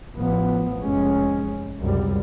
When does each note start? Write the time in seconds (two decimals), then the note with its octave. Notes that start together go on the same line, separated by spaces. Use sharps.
0.14 A1 F3 B3
0.83 F1 G#3 C#4
1.81 C#2 F#2 C3 G3